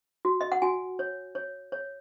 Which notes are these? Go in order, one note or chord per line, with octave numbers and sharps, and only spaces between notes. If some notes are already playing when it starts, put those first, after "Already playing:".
F#4
D#5
F#5
F#4 G#5
C#5
C#5
C#5